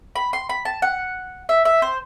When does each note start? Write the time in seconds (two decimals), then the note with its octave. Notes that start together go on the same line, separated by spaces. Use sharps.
0.15 B5
0.33 C6
0.49 B5
0.65 A5
0.82 F#5
1.49 E5
1.65 E5
1.82 C5